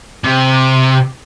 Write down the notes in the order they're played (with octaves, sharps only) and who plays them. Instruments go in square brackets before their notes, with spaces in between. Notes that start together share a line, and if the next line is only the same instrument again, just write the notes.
[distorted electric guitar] C3